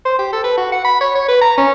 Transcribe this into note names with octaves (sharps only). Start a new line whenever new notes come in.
C5
G4
A4
B4
F#4
F#5
B5
C#5
C#5
B4
A#5
C#4